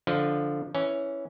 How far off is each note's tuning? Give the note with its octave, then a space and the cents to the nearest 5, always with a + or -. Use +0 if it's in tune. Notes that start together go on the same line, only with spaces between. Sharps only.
D3 +0 F3 +0 D#5 -30
E3 +0 C#4 +0